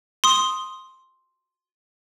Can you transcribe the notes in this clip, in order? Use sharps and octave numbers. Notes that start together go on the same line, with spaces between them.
C6 D#6